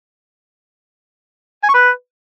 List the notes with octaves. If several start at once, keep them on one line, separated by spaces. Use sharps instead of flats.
G#5
C#6
B4